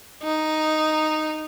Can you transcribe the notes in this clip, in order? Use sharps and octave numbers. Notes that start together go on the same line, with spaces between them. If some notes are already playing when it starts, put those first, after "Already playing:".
D#4